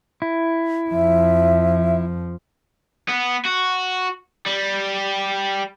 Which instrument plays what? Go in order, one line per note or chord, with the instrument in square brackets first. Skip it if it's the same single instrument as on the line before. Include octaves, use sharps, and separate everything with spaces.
[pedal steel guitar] E4
[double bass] F2 F3 [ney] E5
[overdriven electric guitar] B3
F#4
G3